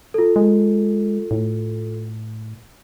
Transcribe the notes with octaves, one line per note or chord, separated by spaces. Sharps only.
F4 A4
G#3
A2